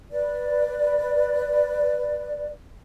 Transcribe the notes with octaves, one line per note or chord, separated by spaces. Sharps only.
B4 D5